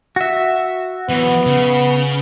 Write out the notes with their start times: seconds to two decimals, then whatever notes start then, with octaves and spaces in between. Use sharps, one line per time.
0.16 F#4 E5
1.09 E3 F#3 B3
1.46 C#3